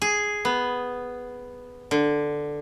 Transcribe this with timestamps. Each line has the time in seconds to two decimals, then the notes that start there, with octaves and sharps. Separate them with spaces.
0.02 G#4
0.45 B3
1.91 D3